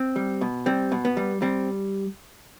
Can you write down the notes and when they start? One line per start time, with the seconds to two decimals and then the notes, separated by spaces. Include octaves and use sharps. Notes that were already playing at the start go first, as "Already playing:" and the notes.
Already playing: C4
0.16 G3
0.41 B2
0.66 G3 C4
0.92 B2
1.05 B3
1.17 G3
1.42 G3 C4